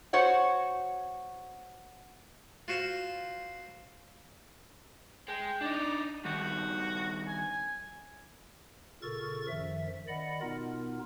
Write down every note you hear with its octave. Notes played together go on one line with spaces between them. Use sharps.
F#4 C5 C#5 F#5
F4 F#4 C5 F5
G#3 G5
D4 D#4 D5
G2 D#3 F#4
G#5
A#2 C#3 A4 A#4 C#6 A6
F#2 D#3 F3 E5
D#3 D5 D#5 F#5 B5
B2 B3 D#4 F4 A#4